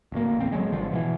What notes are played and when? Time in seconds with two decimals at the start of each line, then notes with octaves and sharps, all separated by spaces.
0.12 D1 D2 A#3
0.37 D#1 A1 C4
0.52 D3 F#3 G#3
0.72 G#1 D3 F3
0.92 B2 D3 E3